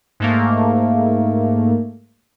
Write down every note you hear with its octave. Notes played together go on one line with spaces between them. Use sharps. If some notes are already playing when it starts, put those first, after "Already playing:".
G#2 A3 A#3